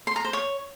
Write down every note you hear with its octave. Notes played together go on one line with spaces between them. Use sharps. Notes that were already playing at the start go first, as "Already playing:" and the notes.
C6
A#5
C5
C#5